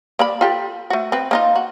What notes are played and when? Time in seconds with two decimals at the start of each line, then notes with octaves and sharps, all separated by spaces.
0.19 A#3 D5 B5
0.41 F4 G4 A4
0.90 A3 F#4
1.12 C4 B4
1.31 A#3 D#4 F4
1.56 F#4